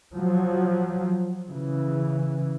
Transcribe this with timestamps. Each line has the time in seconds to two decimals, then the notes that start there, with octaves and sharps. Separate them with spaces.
0.12 F3 F#3
1.48 C#3 E3